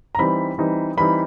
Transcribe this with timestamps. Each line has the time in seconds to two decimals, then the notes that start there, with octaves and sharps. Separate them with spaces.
0.15 A#5
0.19 E3 G3 C4 D#4 B5
0.58 E3 G3 C4 D#4
0.97 E3 G3 C4 D#4 B5